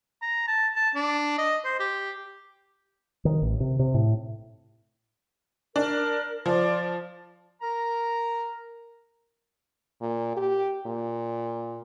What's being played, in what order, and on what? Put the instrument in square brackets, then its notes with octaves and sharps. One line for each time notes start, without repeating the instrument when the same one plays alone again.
[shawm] A#5
A5
A5
D4
D#5
C5
G4
[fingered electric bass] D#3
A1
C3
C3
A2
[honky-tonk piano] D4 [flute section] A#4
[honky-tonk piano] F3 [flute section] D5 C6
[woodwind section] A#4 A#5
[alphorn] A#2
G4
A#2